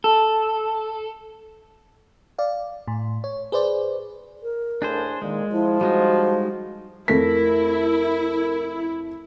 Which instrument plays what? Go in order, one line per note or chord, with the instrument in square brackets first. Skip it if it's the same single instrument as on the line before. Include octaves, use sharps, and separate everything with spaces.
[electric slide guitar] A4
[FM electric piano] D5 F5
A2
C#5
G#4 B4 C5 D5
[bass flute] A#4
[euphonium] A2 [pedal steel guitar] D4 G#4 C5
[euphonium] A#2 [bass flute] D#3 [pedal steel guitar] G#3
[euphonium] F3 [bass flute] E4
[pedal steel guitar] G3 G#3 D#4 [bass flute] F#4
[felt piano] F2 A3 B6 [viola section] E4 [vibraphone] A#4